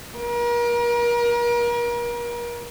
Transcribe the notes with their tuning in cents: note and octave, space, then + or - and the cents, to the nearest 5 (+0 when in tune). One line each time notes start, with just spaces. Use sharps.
A#4 +40